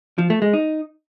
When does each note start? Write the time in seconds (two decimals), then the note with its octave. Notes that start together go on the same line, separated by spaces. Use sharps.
0.18 F3
0.30 A3
0.42 G#3
0.53 D#4